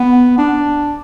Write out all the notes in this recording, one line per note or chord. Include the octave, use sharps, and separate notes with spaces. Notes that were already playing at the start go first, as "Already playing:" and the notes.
Already playing: B3
D4